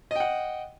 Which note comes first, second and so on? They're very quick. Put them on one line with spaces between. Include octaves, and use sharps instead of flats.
D#5 G5 F#5